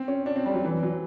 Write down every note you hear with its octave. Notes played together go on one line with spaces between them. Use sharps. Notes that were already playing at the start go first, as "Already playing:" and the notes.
Already playing: C4
C#4
D4
C4
G3
F#3
E3
F#3